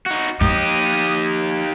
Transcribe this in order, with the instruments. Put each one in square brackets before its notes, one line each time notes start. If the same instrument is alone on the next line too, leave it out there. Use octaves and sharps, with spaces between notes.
[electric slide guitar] D#4 F#4
[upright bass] F3 A#3 [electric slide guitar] D#4 G4 [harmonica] D#6